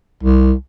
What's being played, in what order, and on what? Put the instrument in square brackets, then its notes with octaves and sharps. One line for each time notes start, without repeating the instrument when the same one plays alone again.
[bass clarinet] C2